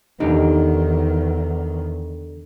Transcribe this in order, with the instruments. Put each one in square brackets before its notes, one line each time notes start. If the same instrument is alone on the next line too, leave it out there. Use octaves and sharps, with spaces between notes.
[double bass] E2 D#3 [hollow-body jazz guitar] D3 D#4 G4